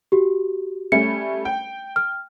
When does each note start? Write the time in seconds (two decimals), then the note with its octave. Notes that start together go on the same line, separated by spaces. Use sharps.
0.12 F#4 G4
0.92 G3 A3 C#4 C#7
1.45 G5
1.96 F6